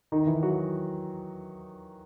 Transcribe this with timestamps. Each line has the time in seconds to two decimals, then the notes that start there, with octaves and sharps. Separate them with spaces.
0.12 D#3 D#4
0.27 E3 E4
0.43 F#3 F#4